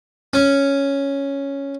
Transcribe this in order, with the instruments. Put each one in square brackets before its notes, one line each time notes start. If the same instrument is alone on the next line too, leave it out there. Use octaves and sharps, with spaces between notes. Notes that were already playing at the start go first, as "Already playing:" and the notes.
[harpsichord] C#4